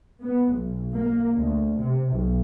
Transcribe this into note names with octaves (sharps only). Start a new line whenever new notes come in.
B3
B1
A#3
D2
C3
B1